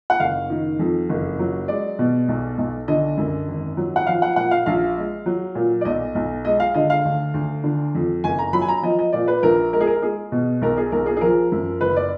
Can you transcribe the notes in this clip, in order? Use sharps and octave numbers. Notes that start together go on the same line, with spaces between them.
F#5
F#1 F5
D#3
F2
F#1
F#3
G#3 D5
B2
B1
B1
D3 D#5
F#2
G#1
F#3
F#5
F3 F5
F#5
A#2 F#5
F5
A#1 F5
G#3
F#3
A#2
D5
B1 D#5
B1
G#3 D#5
F5
D3 D#5
F5
D2
D2
D3
F2
F#1 G#5
A#5
F#3 B5
G#5
A#5
F3 D#5
D#5
A#2 D5
B4
A#1 A#4
G#3 A#4
G#4
A#4
G#3 G#4
B2
B1 A#4
G#4
B1 A#4
G#4
G#4
F3 A#4
F#2
F#1 B4
D5